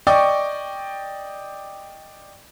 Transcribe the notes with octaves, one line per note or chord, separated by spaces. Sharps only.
D5 D#5 G5 C#6 D6